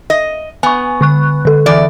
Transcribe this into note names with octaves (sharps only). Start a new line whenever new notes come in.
D#5
B3 G#5 C#6
D3 C#6 F#6
D3 A4
E2 E3 D5